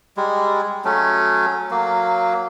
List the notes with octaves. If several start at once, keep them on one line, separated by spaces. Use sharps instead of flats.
G3 G#3
F#3 A3 C#4
F#3 A#3